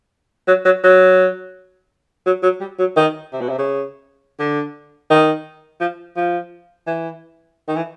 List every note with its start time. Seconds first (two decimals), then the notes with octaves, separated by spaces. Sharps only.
0.47 F#3
0.65 F#3
0.84 F#3
2.26 F#3
2.43 F#3
2.60 G3
2.79 F#3
2.97 D#3
3.33 C3
3.41 B2
3.49 C3
3.58 C#3
4.39 D3
5.10 D#3
5.80 F3
6.16 F3
6.87 E3
7.68 D#3
7.76 E3